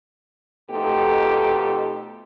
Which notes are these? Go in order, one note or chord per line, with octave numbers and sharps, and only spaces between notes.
F2 B2 A3 D#4 G4 A4